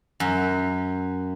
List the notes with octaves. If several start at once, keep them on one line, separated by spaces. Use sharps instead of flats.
F#2